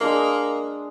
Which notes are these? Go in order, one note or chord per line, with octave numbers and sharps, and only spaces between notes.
G#3 A#3 D4 D#6